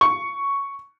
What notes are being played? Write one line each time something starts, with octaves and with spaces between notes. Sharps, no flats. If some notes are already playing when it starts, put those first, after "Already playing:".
C#6